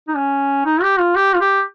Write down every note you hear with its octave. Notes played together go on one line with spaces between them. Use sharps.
D#4
C#4
D#4
G4
F4
G4
F4
G4